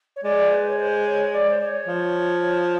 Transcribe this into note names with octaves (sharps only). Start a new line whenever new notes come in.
C#5
G#3 D5
C5
B4
C#5
C5
C#5
D5
C5
D5
C#5
F3